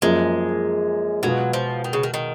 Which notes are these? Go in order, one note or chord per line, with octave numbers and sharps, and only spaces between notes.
F#2 F3 G#3 A#3
B2 F#3 G#3 B3 F4 G#4
F3
D#3
C#3
D#3
D#3